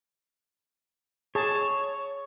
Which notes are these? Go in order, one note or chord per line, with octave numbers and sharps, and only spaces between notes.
G#4 C#5 A5